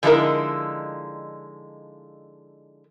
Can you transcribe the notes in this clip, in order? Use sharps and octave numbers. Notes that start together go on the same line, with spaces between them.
D3 F3 G#3 D#4 E4 A#4